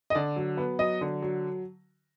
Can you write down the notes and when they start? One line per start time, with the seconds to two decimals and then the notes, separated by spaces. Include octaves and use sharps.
0.10 D#5
0.15 D3 D5
0.36 F#3
0.57 B3
0.79 F#3 D#5
1.01 D3
1.22 F#3